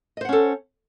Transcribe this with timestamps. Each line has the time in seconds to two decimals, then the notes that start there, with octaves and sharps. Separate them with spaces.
0.17 D#5
0.21 C5
0.25 F#5
0.29 C#4
0.33 A4